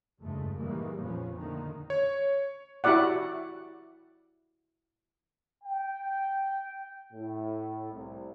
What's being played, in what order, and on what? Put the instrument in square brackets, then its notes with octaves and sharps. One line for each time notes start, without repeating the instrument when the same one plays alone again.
[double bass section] F#1 E2 G2 C#3 G#3 A3
A#2 D#3 E3 G3 G#3 A#3
A#1 F2 A#2 F3 B3 C#4
D3 D#3 A3 A#3
[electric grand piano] C#5
[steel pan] E4 F#4 G4 D5 F#5
[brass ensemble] G5
A2
C2